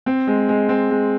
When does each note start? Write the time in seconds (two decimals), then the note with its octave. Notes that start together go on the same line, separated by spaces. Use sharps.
0.06 C4
0.27 G#3
0.49 G#3
0.69 C4
0.90 G#3